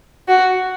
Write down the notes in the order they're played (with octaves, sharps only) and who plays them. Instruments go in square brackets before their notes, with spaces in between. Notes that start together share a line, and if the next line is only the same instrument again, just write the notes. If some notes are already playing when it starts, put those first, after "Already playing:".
[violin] F#4